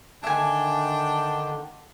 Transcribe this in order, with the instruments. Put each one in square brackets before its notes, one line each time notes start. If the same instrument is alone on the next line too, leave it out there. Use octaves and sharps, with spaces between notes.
[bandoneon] D3 D#3 [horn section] D4 D5 G5 [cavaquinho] E5 G#5